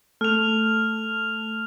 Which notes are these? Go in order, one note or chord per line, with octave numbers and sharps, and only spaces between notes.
A3 F6 F7